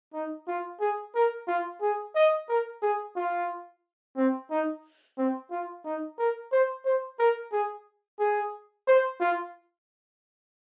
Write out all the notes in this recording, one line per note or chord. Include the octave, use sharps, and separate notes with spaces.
D#4
F4
G#4
A#4
F4
G#4
D#5
A#4
G#4
F4
C4
D#4
C4
F4
D#4
A#4
C5
C5
A#4
G#4
G#4
C5
F4